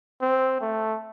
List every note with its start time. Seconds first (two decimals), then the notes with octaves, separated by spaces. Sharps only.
0.21 C4
0.61 A3